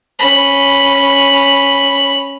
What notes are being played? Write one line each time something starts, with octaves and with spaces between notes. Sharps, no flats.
C#4 B5